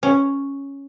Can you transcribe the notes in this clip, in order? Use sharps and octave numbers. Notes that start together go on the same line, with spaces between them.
C#4